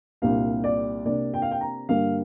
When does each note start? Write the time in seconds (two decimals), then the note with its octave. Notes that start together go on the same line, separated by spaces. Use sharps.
0.22 C2 A#2 G3 A#3 D4 F5
0.64 D5
1.05 C3 A#3 D4 D5
1.34 G5
1.42 F5
1.51 G5
1.61 A#5
1.89 G2 D3 G3 A#3 F5